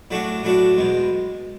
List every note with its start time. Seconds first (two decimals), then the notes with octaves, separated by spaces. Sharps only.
0.11 A2 F#3 A3 D4 F#4
0.43 A2 F#3 A3 D4 F#4
0.77 E2 B2 G#3